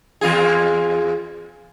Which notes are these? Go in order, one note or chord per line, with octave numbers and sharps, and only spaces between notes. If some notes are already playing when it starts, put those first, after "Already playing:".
E2 F4 G#4